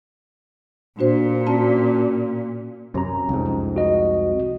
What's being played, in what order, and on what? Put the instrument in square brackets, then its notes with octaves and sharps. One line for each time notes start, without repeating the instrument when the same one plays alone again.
[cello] A#2 [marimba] D4 F#4 C5
[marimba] C#4 F#4 A5
[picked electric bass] F#2 C3 [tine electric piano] C#4 A#5
[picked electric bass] C2 F2 G#2
[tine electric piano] F#4 D#5